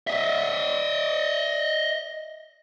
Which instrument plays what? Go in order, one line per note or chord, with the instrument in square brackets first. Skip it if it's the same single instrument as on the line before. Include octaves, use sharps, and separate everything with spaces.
[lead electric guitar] D#5 E5